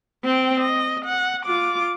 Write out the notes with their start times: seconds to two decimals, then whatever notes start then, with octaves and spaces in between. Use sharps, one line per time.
0.24 C4 G5
0.60 D#5
1.05 F#5
1.46 F4 D6